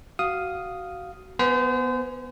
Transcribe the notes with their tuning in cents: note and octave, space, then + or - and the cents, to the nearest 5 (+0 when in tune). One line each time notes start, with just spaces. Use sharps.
F#4 +20 F5 +0 D#6 +0
B3 +0 C5 -35 G#5 +0